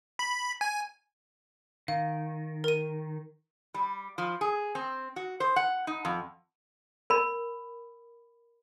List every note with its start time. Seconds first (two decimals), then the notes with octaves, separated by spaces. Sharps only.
0.19 B5
0.61 G#5
1.88 D#3 F5
2.64 A#4 D#7
3.74 G3
4.18 F3
4.41 G#4
4.75 C4
5.16 F#4
5.40 C5
5.56 F#5
5.87 D#4
6.05 F2
7.10 A#4 B5